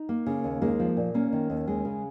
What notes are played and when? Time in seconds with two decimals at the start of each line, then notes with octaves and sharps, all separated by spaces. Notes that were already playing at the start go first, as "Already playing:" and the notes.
Already playing: D#4
0.09 A#3
0.26 C#3
0.44 D#2
0.62 G#3 A#3 D#4
0.80 F3
0.97 A#2
1.14 A#3 C#4
1.33 D#3
1.50 D#2
1.67 G#3
1.85 C#3